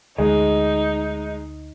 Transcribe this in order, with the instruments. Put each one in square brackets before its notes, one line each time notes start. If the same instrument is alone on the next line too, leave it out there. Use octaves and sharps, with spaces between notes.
[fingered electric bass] D2 [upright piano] G#3 [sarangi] D#4